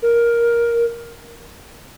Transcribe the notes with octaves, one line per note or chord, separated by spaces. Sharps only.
A#4